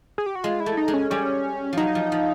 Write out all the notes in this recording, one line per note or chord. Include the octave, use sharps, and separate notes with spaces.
G#4
G4
F#4
G#3 F4
E4
A3
D#4
G#3
C#4
G3 C#4
F3 F#3 D#4
F3
F3